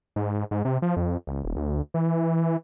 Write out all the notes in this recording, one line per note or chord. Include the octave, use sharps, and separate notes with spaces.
G#2
G#2
C3
F3
F2
C#2
D#1
D2
E3